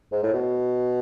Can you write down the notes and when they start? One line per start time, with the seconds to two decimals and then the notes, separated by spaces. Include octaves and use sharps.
0.12 G#2
0.23 A2
0.33 B2